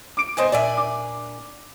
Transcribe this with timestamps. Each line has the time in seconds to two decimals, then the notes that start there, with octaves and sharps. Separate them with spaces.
0.17 D6 D7
0.37 C3 B3 C4 C5 D#5 G#5
0.52 A#2 D4 D5 E5 G#5
0.77 D6